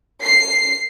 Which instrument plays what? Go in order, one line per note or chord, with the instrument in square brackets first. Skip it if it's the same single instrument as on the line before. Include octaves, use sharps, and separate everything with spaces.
[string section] C7